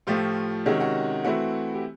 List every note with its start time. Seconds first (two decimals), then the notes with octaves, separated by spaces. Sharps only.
0.07 A2 F3 A3 F4 G4
0.66 C3 D#3 G#3 C#4 F#4
0.80 F#4
1.24 E3 A3 C4 E4 F#4
1.74 G4